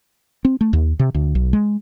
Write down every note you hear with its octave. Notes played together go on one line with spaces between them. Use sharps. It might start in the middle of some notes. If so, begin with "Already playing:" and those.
C4
A3
D#2
C3
D2
B1
G#3